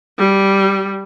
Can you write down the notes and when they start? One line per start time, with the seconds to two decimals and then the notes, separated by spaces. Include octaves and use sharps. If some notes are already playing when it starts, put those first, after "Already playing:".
0.18 G3